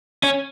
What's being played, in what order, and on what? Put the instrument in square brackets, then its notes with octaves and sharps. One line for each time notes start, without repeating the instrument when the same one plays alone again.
[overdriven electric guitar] C#4